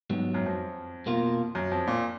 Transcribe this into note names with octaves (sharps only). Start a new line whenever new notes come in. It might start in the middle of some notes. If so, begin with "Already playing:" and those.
G#2 F#3 B3
F#2
F2
B2 A#3 F4
F#2
F2
A#2